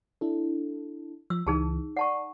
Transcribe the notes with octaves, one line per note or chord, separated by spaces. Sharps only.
D4 E4 A4
F3 E6
C#2 E3 D#4 G#4 A5
D5 F#5 A5 C#6